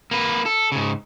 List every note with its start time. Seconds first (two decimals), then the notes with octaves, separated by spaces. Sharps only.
0.11 A#3 B4
0.46 A4
0.72 G#2 C#3